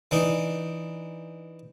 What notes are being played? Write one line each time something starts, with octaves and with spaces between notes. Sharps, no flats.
E3 D4 D#4